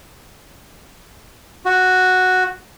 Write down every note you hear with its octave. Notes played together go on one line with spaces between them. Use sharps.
F#4